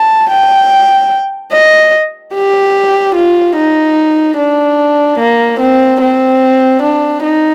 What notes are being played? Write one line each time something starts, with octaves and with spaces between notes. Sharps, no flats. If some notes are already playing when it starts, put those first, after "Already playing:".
Already playing: A5
G5
D#5
G4
F4
D#4
D4
A#3
C4
C4
D4
D#4